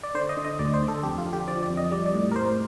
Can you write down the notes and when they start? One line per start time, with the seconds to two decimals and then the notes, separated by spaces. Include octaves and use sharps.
0.03 D5
0.15 D3 C5
0.29 D#5
0.37 D3
0.45 D#5
0.59 D2 D5
0.74 C5
0.82 D3
0.88 A4
1.03 F2 G4
1.18 F4
1.25 D3
1.33 G4
1.47 F3 D5
1.63 D5
1.69 F2
1.77 D#5
1.91 G3 D5
2.06 D5
2.14 A2
2.31 A#4
2.36 A2 C5